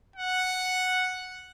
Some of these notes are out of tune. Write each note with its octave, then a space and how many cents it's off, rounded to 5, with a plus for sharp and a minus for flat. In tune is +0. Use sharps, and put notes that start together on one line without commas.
F#5 -5